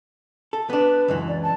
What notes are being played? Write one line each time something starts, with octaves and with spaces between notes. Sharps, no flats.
A4
B3 D4 B4
C#2 F#2 E3
D5
A5